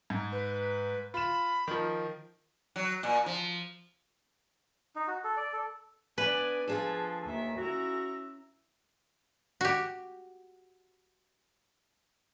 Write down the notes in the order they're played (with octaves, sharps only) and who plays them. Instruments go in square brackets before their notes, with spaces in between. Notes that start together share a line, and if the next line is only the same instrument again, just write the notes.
[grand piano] G#2
[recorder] B4
[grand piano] F4 E7 [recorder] B5
[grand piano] D#3 F3
[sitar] F#3
A#2
F3
[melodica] D#4
F#4
A4
D5
A4
[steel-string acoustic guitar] B3 D4 [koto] B4 [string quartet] D5 G#5
[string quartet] F3 [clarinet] D4 [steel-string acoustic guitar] F4 G#4 A4
[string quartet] D#2 D#3 E5
[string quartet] C#4 E4 A#5 [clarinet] F#4
[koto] F#4 G4